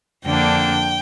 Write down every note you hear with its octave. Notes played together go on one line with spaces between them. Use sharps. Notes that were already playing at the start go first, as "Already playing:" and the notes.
F2 D3 A#3 D4 G5